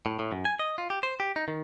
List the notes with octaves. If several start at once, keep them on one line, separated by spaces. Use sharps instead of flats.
A2
A2
F#2
G#5
D#5
F4
G4
C5
G4
D#4
D#3